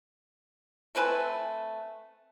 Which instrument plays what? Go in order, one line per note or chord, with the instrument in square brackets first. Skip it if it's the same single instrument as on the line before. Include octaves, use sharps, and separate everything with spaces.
[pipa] A3 C4 B4 G#5